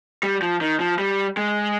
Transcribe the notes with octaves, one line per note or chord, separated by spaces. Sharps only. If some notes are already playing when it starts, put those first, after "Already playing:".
G3
F3
D#3
F3
G3
G#3